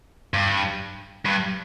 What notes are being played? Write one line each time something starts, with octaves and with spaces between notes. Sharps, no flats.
G2
G2